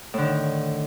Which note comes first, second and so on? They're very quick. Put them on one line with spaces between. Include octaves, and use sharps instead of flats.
A2 D3 D#3